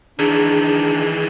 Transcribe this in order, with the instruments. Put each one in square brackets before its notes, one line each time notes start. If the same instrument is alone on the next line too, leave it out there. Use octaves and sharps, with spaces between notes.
[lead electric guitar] D#3 E3 [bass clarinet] D4 [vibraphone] G#4